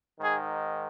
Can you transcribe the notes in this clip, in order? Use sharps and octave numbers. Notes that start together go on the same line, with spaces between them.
G#2 D#3 G#4